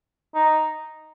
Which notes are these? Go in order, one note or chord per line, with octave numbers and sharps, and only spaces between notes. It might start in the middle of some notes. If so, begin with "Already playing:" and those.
D#4